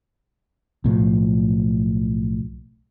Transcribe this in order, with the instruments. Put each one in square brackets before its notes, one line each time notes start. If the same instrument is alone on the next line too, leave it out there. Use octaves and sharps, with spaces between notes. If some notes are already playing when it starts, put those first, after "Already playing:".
[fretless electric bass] B1 A2 F3